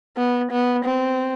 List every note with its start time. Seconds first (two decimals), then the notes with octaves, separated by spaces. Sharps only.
0.17 B3
0.51 B3
0.85 C4